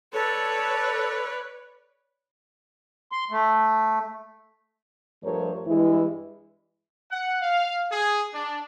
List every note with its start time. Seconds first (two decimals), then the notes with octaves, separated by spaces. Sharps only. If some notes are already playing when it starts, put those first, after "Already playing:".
0.13 A4 B4 C#5 D5
3.12 C6
3.31 A3
5.23 G2 F3 A3 A#4 C5 C#5
5.67 G2 E3 G#3 E4
7.11 F#5
7.41 F5
7.92 G#4
8.34 D4